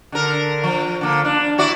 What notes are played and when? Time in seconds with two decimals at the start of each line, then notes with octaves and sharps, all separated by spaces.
0.12 D3 A#4
0.64 F3
1.01 D3 A#3
1.25 D4
1.58 E4 F#4 D5